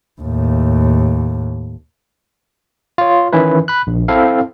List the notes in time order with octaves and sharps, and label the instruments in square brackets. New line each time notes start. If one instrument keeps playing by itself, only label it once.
[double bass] D#2 A2
[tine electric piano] F4 C#5
D#3 E3 C#4 E4 B4
B5 F#6
A#1
C4 E4 A4 F5